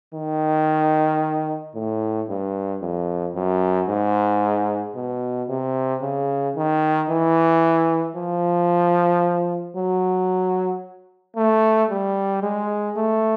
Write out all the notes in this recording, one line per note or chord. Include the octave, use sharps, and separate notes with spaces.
D#3
A2
G2
F2
F#2
G#2
B2
C3
C#3
D#3
E3
F3
F#3
A3
G3
G#3
A3